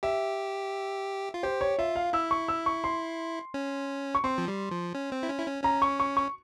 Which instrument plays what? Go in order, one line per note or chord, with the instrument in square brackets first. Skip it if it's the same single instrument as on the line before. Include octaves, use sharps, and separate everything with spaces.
[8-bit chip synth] G4 [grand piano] E5
[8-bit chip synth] F4
[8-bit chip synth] G4 [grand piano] C5
[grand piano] C#5
[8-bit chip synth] F4 [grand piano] E5
[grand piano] F5
[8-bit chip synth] E4 [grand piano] E6
[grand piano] C#6
E6
C#6
C6
[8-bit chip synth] C#4
[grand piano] C#6
[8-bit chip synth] C4 [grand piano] C6
[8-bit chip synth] F3
G3
F3
C#4
C4
E4
C#4
E4
C#4
[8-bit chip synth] C#4 [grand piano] A#5
[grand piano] C#6
C#6
C#6